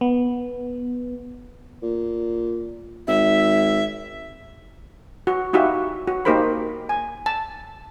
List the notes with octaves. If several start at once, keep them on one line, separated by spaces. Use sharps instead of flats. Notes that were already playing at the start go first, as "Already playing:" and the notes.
B3
A#2
G#1 E5
F#4
D#4 E4 F#4 G4 E5 F5
F#4
A#3 D#4 G4 A#4 C5 B5
G#5
A5